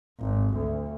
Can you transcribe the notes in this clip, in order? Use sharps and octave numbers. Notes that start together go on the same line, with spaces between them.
G#1
D2